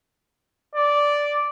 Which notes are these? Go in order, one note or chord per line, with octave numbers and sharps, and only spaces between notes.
D5